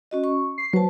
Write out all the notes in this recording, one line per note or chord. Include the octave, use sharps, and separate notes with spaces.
C#4 F#4 D#5
C#6
C7
F#3 B4 C5 A5